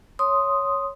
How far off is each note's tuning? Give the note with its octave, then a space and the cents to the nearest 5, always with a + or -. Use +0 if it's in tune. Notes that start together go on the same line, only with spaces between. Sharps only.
C#5 +0 C6 +0 D#6 +0